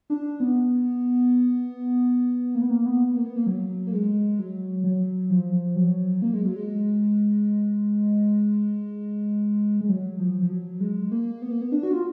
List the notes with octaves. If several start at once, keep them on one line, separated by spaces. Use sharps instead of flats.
D4
B3
A#3
B3
A#3
B3
A#3
B3
A#3
F#3
A#3
G#3
F#3
F#3
F3
F#3
A#3
G#3
F#3
G#3
G#3
F#3
F3
F3
F#3
G#3
A#3
B3
A#3
B3
D4
F#4
F4